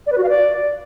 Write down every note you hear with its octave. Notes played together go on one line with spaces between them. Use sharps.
D5
B4
F#4
F5
D5